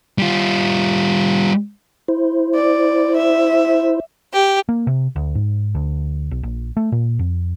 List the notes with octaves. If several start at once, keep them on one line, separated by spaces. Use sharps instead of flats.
G3 F4
E4 C5
D5
E5
G4
A#3
C3
D2
G#2
D2
B1
A#1
A3
A#2
F2